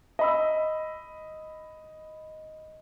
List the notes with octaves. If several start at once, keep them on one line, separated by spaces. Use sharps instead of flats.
D#5 B5 E6